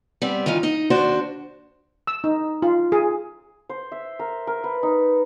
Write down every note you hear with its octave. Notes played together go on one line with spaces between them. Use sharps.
G3 B3 C4
D#3 E3 D#4 F4
D#4 D#5
D#2 D4 F#4 C5
E6
D#4
F4
G#4
C5
E5
A#4
A#4
B4
D#4